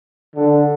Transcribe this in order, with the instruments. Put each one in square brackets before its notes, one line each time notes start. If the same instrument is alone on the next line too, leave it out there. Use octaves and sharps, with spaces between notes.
[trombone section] D3